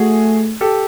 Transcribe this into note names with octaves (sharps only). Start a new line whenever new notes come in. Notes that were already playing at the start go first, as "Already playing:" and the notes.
Already playing: A3 F#4 G#4
G4 A4